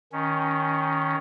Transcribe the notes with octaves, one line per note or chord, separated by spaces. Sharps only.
D#3 C#4